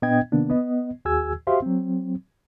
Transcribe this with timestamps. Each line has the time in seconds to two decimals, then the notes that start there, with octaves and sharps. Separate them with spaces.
0.02 A#2 B3 D4 D#5 G5 G#6
0.32 C3 D#3 A#3 B3 D4
0.50 B3 D#5
1.05 D#2 F#4 G#4 G#5 E6 G#6
1.47 F#4 G4 C5 E5 F5 C6
1.62 F#3 C4